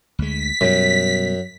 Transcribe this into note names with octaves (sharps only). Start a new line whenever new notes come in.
D2 G#3 B6
F#2 B2 G3